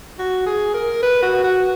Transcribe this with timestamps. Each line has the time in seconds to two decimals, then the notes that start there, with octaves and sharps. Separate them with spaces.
0.19 F#4
0.46 G#4
0.74 A#4
1.03 B4
1.22 F#4
1.44 F#4